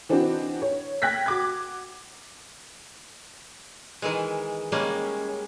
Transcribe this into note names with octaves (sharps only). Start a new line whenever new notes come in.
E3 C4 D4 D#4 F#4
C#5
G5 F#6 G#6 A#6 B6
F#4 D6 G#6
D#3 E3 G#3
G3 G#3 A#3 C#4